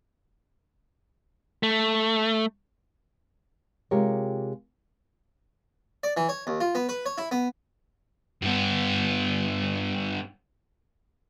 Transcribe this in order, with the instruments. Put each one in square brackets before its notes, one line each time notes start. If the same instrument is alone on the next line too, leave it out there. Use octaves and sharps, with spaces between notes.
[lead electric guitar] A3
[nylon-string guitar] C3 G#3 F4 G4 A#4 C#5
[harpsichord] D5
E3
C#5
D#2
F4
B3
B4
C#5
E4
B3
[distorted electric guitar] G2 B3